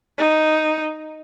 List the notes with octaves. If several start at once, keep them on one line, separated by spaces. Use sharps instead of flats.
D#4